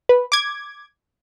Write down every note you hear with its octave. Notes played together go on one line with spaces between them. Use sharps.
B4
D6 G#6